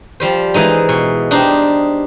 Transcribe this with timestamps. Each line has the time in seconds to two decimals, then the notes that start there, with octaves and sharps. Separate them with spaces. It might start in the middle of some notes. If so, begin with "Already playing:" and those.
0.20 F3 G3 C5
0.54 E3 G#3 D#4
0.89 B2
1.31 D4 D#4 G4 C5